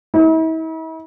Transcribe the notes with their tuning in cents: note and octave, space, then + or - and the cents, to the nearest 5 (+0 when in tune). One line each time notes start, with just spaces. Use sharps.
E4 -45